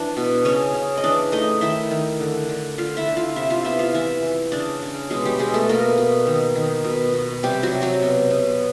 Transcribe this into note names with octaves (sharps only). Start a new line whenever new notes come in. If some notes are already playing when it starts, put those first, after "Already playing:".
Already playing: E3 D4 E4 D5
B2
C#3 C#4 C#5
C#3
D#5
E3 D4 D5
A3 D#4 D#5
D#3 E4 E5
D#3
D3
D3
D3 F4 F5
E4 E5
D3
F4 F5
C3 E4 E5
F4 F5
B3 E4 E5
F4 F5
E3 E4 E5
E3
C#3 D4 D5
C#3
B2 G#3 G#4
G3 G4
B2 G#3 G#4
A3 A4
B2 A#3 A#4
B2
D#3
D#3
B2
B2
C3 G3 G4
F#3 F#4
C3
F#3 F#4
B2
B2